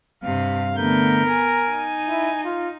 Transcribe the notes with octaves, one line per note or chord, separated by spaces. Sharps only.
G2 C3 F5
D3 A3 B3 A#4 G6
G#5
D#4
E4
F4